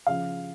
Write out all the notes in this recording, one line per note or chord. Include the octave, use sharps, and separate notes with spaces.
C#3 F3 F5